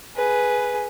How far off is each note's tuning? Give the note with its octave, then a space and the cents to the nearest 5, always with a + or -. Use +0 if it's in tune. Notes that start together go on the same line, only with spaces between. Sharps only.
G#4 +5 B4 +0